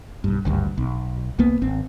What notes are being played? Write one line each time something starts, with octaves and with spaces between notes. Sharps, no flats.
B1 G2
G#1 D2 G2
B1
C2 A#3 B3
G#1 C4